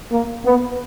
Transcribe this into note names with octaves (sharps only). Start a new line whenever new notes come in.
A#3
B3